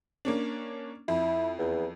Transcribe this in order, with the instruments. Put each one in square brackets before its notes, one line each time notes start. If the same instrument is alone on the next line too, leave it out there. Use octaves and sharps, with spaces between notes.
[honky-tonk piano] A#3 C#4 D4
[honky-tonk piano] F2 [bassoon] E4
[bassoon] E2